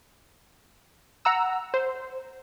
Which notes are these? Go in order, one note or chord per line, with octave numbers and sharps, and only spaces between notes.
F#5 A#5 E6
C5